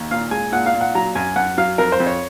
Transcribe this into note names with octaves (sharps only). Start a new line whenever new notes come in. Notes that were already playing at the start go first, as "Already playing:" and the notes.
Already playing: D#2
A#2 F5
G#3 G#5
A#2 F#5
F5
A#2
F#5
F#3 A#5
F#2 G#5
F#2 F#5
F#3 F5
F2 A#4
C5
F2
C#5